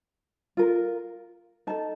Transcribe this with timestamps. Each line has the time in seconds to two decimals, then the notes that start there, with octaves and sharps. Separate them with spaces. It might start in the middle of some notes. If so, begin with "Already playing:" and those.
0.57 F4 A#4
1.67 D#4 A4 A5